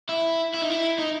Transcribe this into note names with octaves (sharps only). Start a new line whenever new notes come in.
E4
E4
D#4
E4
D#4